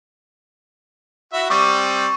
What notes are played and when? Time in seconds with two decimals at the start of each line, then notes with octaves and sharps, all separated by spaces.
1.33 E4 F#4 E5
1.50 G3 C4 D5 C#6